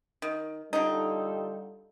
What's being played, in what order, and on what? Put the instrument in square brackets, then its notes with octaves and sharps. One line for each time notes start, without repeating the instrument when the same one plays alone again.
[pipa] D#3
[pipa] D3 D#4 [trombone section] G3 F4 A4